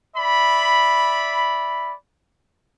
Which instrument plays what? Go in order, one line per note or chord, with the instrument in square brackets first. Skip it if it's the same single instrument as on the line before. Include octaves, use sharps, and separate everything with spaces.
[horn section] D5 E5 B5